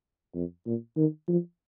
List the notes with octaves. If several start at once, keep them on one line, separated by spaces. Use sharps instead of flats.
F2
A#2
D#3
F3